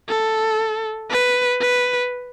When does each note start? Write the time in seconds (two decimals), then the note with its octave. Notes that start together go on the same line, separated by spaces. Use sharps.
0.09 A4
1.11 B4
1.61 B4